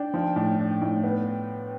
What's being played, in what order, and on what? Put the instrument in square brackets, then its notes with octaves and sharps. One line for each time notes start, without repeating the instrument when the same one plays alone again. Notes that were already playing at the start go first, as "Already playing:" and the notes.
Already playing: [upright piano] D4 [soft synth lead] G5
[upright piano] F3
A2
D4
A2
B3